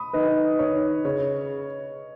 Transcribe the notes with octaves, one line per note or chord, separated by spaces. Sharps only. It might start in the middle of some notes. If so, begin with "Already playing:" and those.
Already playing: B5 D#6
D#3 B4 D#5
D#3 C#5
C#3 C#5